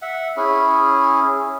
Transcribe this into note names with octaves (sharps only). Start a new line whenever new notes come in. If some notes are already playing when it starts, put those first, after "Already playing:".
E5 F#5
C#4 E4 G#4